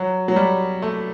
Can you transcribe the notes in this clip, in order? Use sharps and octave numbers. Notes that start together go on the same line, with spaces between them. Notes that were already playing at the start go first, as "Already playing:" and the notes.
Already playing: F#3
F#3
G3
A3